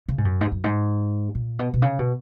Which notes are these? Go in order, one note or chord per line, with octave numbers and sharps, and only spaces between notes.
C#3
G#2
F#2
G#2
F#2
G#2
A#2
B2
B2
C#3
B2